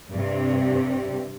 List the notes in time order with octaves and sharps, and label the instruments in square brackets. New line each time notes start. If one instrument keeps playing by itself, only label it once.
[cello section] G2 C3